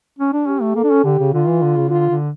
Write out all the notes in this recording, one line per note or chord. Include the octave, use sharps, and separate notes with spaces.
C#4
D4
C#4 G4
A3
A#3 A4
D4
C#4
D3 G4
C#3
D3 F4
E3
D3
C#3
D3 F4
D3